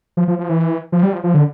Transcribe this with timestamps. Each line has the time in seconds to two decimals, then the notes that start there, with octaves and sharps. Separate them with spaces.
0.17 F3
0.28 F3
0.39 F3
0.49 E3
0.92 F3
1.03 G3
1.13 F3
1.24 F3
1.34 D3